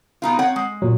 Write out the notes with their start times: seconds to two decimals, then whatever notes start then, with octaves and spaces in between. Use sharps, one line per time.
0.22 B2 D#4 F4
0.39 C4 C#5 F#5
0.56 G#3
0.82 A#2 F#3